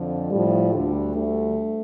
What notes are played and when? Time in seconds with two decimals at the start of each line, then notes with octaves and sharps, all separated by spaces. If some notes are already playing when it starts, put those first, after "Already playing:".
Already playing: F2 D3 F3
0.31 A2 F3 G3
0.74 D2 D3 G3
1.14 D2 D3 G3 A3